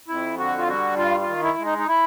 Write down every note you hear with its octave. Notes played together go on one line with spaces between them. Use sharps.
F2 E4
D3 F#4
F4
G3 F#4
G2 F4
F4
D#3
E4
G#3
D#4
D#4
E4